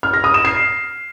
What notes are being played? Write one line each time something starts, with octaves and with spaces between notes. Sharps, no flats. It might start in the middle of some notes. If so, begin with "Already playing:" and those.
F6
A#6
D#6
E7
C7